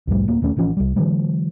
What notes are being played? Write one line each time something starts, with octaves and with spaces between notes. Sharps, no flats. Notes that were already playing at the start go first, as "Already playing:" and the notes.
C2 F2 A2 G3
D1 A#3
E1 D#2 A3 C#4
A1 E3 F3 C#4
C2 G3
D3 E3 F#3 G#3